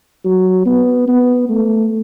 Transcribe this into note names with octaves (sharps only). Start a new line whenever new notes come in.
F#3
B3
B3
A3